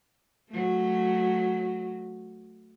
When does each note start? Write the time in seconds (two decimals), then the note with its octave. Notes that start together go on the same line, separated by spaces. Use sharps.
0.49 F#3 A3